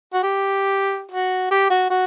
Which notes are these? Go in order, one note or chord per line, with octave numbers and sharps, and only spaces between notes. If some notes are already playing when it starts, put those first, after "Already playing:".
F#4
G4
F#4
G4
F#4
F#4